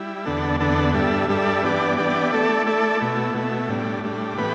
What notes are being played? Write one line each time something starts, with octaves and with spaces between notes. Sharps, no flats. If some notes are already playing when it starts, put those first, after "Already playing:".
Already playing: G3 E4
E2 D3 B3 D4 A4
E2 D3 B3 D4 A4
G2 G3 D4 A4 E5
G2 G3 D4 A4 E5
E3 B3 D4 G4 D5
E3 B3 D4 G4 D5
A3 E4 A4 D5
A3 E4 A4 D5
B2 A3 E4
B2 A3 E4
A2 G3 D4
A2 G3 D4
A2 E3 B3 G4 B4